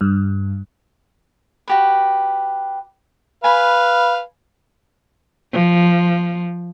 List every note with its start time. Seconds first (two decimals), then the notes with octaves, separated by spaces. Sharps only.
0.01 G2
1.68 F#4 G4 B4
3.44 B4 F5 G#5 B5
5.53 F3